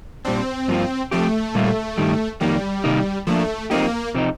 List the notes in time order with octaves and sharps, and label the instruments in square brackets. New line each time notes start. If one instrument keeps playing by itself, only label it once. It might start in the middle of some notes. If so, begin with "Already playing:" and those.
[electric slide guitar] A#2 G3 D4 [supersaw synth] C4
[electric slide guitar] G2 F3 A#3 F4
[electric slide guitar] F3 C4 G4 [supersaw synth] A3
[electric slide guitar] A#2 G3 A#3 F4
G2 D#3 G3
[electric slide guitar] F2 D#3 A#3 [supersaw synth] G3
[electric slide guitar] C3 D#3 A#3 D#4
[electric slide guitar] F3 A#3 D4 [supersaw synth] A3
[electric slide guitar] F3 C4 D#4 G4 [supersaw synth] A#3
[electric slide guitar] C3 F3 C4 D#4